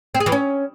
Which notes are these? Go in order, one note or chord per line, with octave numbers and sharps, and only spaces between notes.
C4
G#4
E3
C#4